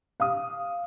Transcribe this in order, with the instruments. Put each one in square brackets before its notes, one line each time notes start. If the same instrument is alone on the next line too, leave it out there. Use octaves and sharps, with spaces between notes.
[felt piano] F5 D#6